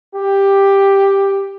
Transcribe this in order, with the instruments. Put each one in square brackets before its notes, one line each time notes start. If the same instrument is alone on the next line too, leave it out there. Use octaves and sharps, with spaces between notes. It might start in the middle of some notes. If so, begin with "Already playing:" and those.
[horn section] G4